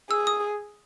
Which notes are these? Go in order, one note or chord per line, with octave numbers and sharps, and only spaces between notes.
G#4 E6
D#6